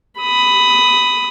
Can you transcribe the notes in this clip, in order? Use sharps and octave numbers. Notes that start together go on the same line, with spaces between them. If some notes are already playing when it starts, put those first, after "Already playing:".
B5 D#6